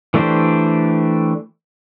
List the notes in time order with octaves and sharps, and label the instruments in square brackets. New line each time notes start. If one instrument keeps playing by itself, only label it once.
[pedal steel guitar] E3 A3 D4 G4 C5